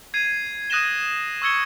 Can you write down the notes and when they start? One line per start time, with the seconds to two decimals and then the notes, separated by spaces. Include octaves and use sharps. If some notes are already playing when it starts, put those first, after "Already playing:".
0.14 G#6 C7 D#7
0.70 D#6 F#6 A#6 D#7 E7 G7
1.42 C#6 E6 G#6 C#7 G7